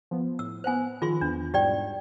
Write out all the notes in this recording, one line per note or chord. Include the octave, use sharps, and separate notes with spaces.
F3 B3
A2 E6
B3 C5 F#5 G#5 F#6
D#3 F3 F4 G#4 C6
E2 B3 D4
G#2 B2 G3 G4 D5 G5